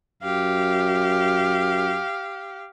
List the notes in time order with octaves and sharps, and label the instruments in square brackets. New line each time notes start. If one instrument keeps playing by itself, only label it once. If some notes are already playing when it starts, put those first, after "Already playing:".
[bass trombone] F#2 [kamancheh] G4 F5